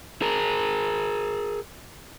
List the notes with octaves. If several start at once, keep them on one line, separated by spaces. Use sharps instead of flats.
G#4 A#4